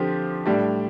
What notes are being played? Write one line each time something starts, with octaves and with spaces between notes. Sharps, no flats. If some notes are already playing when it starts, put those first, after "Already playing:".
Already playing: D3 F3 C4 G4
A2 G3 D4